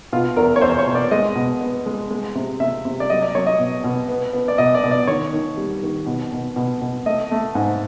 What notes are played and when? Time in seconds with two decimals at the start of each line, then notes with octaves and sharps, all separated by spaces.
0.13 B2 F4
0.36 E2 A#4
0.56 C#5
0.61 E2 C5
0.79 C#5
0.86 B2
0.95 D5
1.11 G#3 D#5
1.36 B2
1.61 B3
1.86 G#3
2.10 G#3
2.35 C3
2.60 C3 E5
2.85 C3
3.00 D5
3.10 F#3 D#5
3.22 D5
3.35 F#3 C#5
3.47 D#5
3.59 B2
3.84 B2
4.09 B3
4.33 B3
4.48 D5
4.58 B2 D#5
4.75 D5
4.84 B2
4.91 D5
5.07 D#3 C#5
5.33 D#3
5.57 G3
5.83 D#3
6.06 B2
6.32 B2
6.56 B2
6.82 B2
7.06 A3 D#5
7.31 A3
7.55 G#2